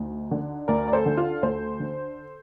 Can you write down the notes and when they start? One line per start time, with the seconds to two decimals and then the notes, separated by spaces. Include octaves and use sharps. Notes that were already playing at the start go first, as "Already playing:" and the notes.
Already playing: D2 D#4
0.31 D3
0.68 D2 A#4 D5
0.88 D5
0.93 A4 C5
1.06 D3
1.17 F4 A4
1.43 D2 A4 C5
1.80 D3